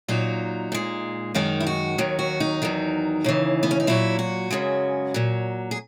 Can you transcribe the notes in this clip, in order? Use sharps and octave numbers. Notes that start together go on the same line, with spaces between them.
A#2 F#3 D#4
A#2 G#3
F#2 D#3 G#3 D#4
E4
F#4
D#2 D#3 F#3
F#4
D#4
E2 D#3 F#3
D#2 C#3 E3
B3
C#4
D#4
A#2 F#3 E4
F#4
F#2 C#3 G#3
A#2 F#3
G#4